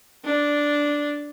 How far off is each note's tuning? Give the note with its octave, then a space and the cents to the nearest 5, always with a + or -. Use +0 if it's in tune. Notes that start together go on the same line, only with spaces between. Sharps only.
D4 -5